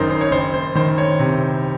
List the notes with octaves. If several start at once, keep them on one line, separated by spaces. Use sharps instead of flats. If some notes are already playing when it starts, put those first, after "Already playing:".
Already playing: F#1 F#2 D#3 D#4 A#4 C5
C5
C#5
F#1 C5
C5
D#3 C5
C#5
C3